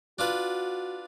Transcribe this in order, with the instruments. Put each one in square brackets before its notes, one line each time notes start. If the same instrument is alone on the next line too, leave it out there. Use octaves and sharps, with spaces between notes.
[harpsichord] D4 F4 B4 [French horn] F#4